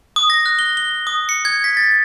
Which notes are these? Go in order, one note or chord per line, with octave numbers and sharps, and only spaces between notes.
D#6
A#6
F#6
G7
G7
D#6
C#7
G#6
B6
A6